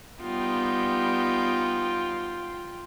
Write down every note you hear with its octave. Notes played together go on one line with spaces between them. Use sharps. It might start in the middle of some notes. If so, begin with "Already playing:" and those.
G3 B3 D#4 F4 G5